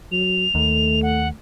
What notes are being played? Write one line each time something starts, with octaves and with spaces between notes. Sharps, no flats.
F#3 F7
D#2 A3
F#5